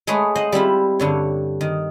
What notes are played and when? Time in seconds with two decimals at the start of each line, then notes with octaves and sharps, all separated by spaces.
0.07 G#3 A3 G#4 B4 C#5
0.35 C5 D#5 F#5
0.52 G3 C4 E4 F4
0.99 G2 D3 C#5
1.61 D#3